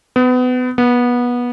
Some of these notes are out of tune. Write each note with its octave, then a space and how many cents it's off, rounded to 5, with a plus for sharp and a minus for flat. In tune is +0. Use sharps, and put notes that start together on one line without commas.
B3 +30
B3 -20